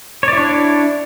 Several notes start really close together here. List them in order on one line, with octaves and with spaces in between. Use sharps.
C#5 D5 E4 D4